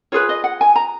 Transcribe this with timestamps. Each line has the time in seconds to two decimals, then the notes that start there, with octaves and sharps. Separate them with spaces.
0.12 F4 G#4 B4 C#5
0.29 D#5
0.44 F#5
0.61 G#5
0.76 A#5